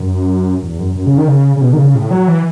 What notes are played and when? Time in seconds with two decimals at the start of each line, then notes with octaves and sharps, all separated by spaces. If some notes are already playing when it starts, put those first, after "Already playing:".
Already playing: F#2
0.63 E2
0.79 F#2
0.95 F#2
1.06 C#3
1.18 D#3
1.28 C#3
1.56 C#3
1.61 B2
1.73 D#3
1.77 C#3
1.95 A2
2.11 F#3
2.28 E3